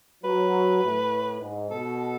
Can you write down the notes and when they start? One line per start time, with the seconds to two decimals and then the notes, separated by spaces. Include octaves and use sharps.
0.24 F#3 B4
0.83 A2
1.41 G#2
1.71 B2 A4